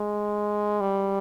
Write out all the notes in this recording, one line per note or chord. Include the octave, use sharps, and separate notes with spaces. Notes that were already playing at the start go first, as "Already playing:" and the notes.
Already playing: G#3
G3